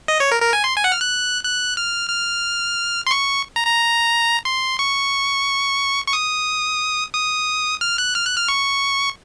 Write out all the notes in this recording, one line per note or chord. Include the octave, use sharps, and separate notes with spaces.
D#5
C#5
A#4
A#4
G#5
C6
G#5
F#5
F6
F#6
F#6
F6
F6
C6
C#6
A#5
A#5
C6
C#6
C#6
D#6
D#6
F6
F#6
F6
F#6
F6
C#6